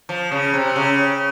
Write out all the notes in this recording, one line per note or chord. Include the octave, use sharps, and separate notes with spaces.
F3
C#3
C3
C#3